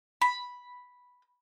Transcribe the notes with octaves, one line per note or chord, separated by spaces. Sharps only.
B5